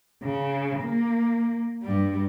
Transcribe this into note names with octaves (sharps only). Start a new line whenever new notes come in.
C#3
A#3
G2 G3